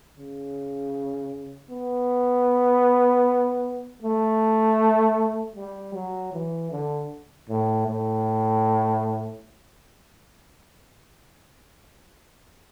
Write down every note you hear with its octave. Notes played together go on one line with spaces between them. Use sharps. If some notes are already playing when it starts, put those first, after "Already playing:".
C#3
B3
A3
G3
F#3
E3
D3
A2
A2